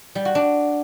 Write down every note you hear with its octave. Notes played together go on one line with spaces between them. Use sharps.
G3
F#4
D4